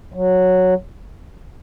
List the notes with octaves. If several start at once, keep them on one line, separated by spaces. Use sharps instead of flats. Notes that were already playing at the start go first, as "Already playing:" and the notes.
F#3